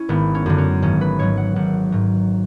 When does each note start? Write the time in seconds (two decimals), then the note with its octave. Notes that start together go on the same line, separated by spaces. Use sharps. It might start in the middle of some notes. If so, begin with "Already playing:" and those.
Already playing: C#4 E4
0.09 G#1 B3
0.35 C#4
0.46 F#2 D3
0.58 C#4
0.82 G#1 C#4
1.01 B4
1.19 G#2 F#3 C#5
1.37 F#5
1.56 G#1 F#5
1.92 G#2 F#3